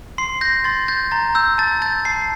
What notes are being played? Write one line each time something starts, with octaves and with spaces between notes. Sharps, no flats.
C6 C7
G6 A#6
C6 A6
G6 A6
A#5 A6
E6 G6
A5 A6
G6 A6
A5 C7